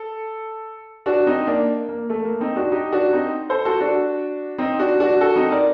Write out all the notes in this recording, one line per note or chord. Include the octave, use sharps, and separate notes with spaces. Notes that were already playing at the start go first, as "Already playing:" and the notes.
Already playing: A4
D4 F#4
C4 D#4
A#3 D4
A#3
A3
A#3
C4 D#4
D4 F#4
D#4 G4
D4 F#4
C4 D#4
A4 C5
F#4 A4
D4 F#4
C4 D#4
D4 F#4
D4 F#4
F#4 A4
C4 D#4
A#4 D5